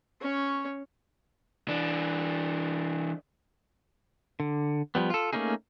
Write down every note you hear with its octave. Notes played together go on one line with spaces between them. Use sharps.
C#4 C#5
E3 D4
D3
F3 G3 B3
F4 A4
A3 A#3 C#4 D#4 G#4